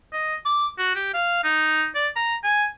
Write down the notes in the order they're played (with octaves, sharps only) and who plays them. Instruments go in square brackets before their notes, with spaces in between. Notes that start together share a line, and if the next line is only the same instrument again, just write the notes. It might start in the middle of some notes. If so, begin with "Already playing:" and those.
[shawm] D#5
D6
F#4
G4
F5
D#4
D5
A#5
G#5